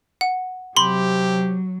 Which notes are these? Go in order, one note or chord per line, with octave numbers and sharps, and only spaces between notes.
F#5
C3 F#3 G4 B5 C6